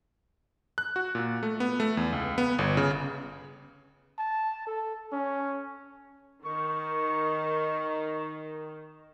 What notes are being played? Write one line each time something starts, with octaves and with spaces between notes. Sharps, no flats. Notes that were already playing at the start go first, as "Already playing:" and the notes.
F#6
F#4
A#2
A3
B3
A3
E2
C#2
B3
G1
C#3
A5
A4
C#4
D#3 C#6